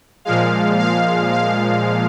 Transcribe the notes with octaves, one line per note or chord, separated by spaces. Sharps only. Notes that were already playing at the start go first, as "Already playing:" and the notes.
A#2 F3 G#3 F5
F5
F5